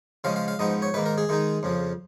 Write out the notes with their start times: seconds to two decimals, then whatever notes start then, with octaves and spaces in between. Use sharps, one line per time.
0.24 C#3 F3 G#3 C#4 F5
0.36 F5
0.48 F5
0.59 G#2 F3 B3 D#4 D#5
0.82 C#5
0.94 G#2 D#3 A#3 B4
1.06 A#4
1.18 G#4
1.29 D#3 G#3 D#4
1.63 F2 C#3 F3